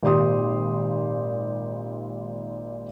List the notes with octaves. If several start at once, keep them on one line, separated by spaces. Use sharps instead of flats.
G#1 A#2 G4 C6 D#6